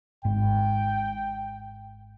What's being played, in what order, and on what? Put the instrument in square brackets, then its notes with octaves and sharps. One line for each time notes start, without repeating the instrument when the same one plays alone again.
[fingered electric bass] G#1 G#2 [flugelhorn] G5